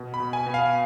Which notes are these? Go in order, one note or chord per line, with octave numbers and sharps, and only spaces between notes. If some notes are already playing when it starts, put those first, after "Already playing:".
Already playing: B2
B5
B2
G#5
B2
F5